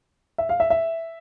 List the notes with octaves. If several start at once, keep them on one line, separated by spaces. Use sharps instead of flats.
E5
F5
E5
E5